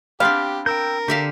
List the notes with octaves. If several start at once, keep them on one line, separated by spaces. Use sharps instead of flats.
B3 C4 D4 G4 F5
A#4 G5 E6 G6
D3 G4 E5 F5